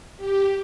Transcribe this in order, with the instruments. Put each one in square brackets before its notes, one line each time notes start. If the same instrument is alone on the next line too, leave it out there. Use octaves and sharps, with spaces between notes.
[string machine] G4